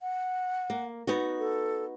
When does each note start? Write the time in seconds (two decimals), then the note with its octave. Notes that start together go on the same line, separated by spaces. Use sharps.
0.01 F#5
0.70 A#3
1.07 B3 D#4 F#4
1.39 A4